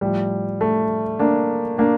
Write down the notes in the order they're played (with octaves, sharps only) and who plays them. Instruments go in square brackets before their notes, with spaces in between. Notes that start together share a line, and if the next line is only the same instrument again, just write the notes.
[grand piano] A2 F3 G3
A3
A#3 D4
A#3 D4